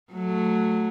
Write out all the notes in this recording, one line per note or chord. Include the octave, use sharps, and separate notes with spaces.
F#3 A3